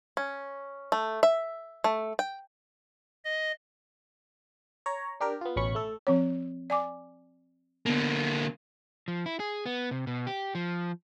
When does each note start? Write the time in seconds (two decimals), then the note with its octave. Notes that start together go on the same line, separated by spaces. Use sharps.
0.17 C#4
0.92 A3
1.23 E5
1.84 A3
2.19 G5
3.25 D#5
4.86 C#5 A#5
5.20 D4 G4 A#4
5.41 B3 F4
5.56 A1 B2 C#4 B5 C#6 C#7
5.75 A3 A4
6.07 F3 C4 C#5
6.70 D5 G#5 D6
7.86 D3 A#3 B3
9.08 F3
9.26 E4
9.40 G#4
9.66 B3
9.91 C3
10.07 B2
10.27 G4
10.55 F3